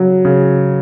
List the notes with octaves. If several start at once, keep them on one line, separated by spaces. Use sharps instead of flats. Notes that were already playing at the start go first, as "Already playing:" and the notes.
Already playing: C#3 F#3
C#3